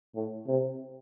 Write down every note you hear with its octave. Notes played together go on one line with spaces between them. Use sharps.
A2
C3